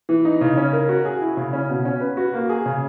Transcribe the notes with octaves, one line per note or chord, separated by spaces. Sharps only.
E3
D#4
C#3
C#4
A#4
F#4
G#4
E4
C#3
C#4
B2
C#4
B4
F#4
A#3
G#4
C#3